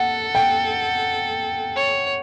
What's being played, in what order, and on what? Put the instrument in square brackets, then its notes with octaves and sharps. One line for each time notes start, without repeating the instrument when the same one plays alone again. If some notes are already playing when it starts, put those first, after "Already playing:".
Already playing: [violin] A4 [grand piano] F#5
[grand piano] G5
[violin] C#5